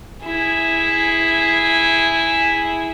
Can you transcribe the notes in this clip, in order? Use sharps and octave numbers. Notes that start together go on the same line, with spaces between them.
E4 G#4